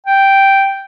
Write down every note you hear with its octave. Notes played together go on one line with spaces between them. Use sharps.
G5